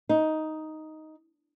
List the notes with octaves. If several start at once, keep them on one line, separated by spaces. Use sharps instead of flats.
D#4